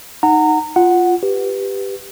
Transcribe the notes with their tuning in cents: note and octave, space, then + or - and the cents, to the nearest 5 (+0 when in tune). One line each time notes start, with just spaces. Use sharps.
D#4 +0 F#5 +0 A#5 -25
F4 +0 F#5 +0
G4 +0 B4 +0